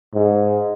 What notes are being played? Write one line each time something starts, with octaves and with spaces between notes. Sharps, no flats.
G#2